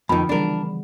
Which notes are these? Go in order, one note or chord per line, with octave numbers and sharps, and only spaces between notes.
F2 D3 D#3 F3 B3 B5
C#3 E3 G3 D4 A#4